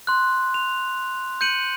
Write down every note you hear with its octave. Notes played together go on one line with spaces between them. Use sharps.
C6 F#6
F7
G6 C#7 D#7 F#7